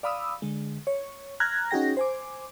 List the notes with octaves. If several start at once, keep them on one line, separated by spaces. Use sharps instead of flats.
D5 F5 B5 D#6 E6
D3 G#3
C#5
A#5 F6 F#6 G#6 A#6
C#4 D#4 F#4 G#4 G5 A#6
C5 G#5 D6